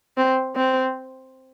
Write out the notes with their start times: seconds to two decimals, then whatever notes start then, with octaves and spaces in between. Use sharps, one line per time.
0.17 C4
0.55 C4